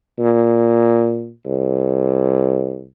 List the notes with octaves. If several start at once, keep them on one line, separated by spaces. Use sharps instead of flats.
A#2
C2